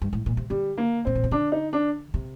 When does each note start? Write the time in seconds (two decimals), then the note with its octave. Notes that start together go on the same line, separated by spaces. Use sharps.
0.02 G2
0.13 A2
0.26 A#2
0.37 C3
0.50 D3 G3
0.78 A#3
1.05 A2 C4
1.15 A#2
1.24 C3
1.31 D3 D4
1.52 D#4
1.73 D4
2.14 C3